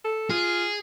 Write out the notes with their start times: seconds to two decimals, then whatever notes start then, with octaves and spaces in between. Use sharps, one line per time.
0.05 A4
0.30 F4 G#4